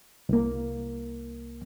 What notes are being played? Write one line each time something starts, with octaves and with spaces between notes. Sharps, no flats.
C2 A#3